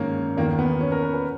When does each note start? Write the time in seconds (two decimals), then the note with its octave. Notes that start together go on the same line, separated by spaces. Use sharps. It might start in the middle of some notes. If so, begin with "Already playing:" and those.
Already playing: G#2 D#3 A#3 C#4
0.36 E2 D#3 A#3
0.59 B3
0.81 C#4
0.92 A#4
1.03 B4
1.14 B4